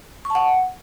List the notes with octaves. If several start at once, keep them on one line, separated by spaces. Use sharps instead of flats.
C#6
A5
F#5